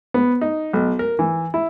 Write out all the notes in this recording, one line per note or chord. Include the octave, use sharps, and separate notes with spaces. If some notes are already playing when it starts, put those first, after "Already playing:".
B3
D#4
B1
A#4
E3
E4